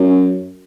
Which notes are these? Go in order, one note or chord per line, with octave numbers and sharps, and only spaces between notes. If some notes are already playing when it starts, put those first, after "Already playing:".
Already playing: F#2